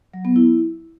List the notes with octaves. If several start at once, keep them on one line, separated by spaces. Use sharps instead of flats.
F#3
B3
E4